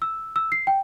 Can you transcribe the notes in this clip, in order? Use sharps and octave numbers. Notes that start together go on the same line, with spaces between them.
E6
E6
C7
G5